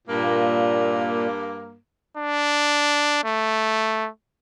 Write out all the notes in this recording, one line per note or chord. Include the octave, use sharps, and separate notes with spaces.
G2 A#2 A#3
D4
A3